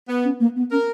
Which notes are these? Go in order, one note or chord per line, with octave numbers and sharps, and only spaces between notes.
B3
C#4
A#3
B3
C#4 A#4